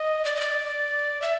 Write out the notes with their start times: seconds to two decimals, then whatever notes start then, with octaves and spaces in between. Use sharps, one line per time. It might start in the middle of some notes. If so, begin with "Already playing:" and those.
Already playing: D#5
0.25 D5
0.36 D#5
0.41 D5
1.22 E5